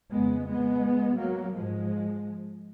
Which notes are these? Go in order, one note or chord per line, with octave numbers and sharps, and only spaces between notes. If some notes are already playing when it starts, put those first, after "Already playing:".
F2 C#3 G#3 B3
G#3 B3
F#3 A#3
G#2 F3 G#3